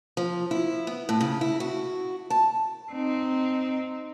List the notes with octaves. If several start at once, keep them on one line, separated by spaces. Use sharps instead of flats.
F3
E4
B3
A2
C#3
E4
F#4
A5
C4 D#4